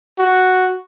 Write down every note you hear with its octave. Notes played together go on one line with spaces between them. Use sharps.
F#4